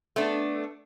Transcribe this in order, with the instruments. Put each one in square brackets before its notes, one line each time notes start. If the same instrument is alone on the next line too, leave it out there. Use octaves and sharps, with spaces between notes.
[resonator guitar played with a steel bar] A3 B3 D4